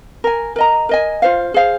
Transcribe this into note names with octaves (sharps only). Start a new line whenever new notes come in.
A#4 G#5
A#4 D#5 A#5
A#4 D#5 G#5
F4 C5 F5
G#4 C5 F5